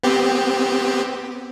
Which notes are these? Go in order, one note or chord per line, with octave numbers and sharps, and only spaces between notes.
B3 C4 G4